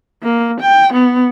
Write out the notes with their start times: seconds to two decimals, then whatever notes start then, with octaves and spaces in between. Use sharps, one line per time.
0.23 A#3
0.61 G5
0.93 B3